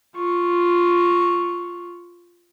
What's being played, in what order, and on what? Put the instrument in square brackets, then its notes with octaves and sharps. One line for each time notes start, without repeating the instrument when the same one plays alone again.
[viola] F4 C#6